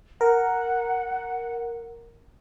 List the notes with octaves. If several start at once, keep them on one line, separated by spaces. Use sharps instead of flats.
A#4 F#5